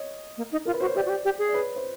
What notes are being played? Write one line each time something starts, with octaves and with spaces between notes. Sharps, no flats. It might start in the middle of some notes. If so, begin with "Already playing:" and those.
Already playing: C#5 D#5
A#3
D#4
F4 A#4
B4
F#4 C5
C#5
G4 C5 D5
F#4
G4
G4
G#4
D5
B4 C#5
C5